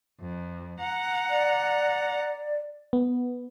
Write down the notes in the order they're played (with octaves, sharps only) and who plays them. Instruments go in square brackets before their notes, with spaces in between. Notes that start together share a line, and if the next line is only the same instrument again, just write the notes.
[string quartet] F2
F#5 A#5
[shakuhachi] D5
[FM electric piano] B3